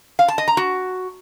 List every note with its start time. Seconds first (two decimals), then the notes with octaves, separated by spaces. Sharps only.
0.19 F5
0.28 A5
0.38 D#5
0.48 A#5
0.57 F#4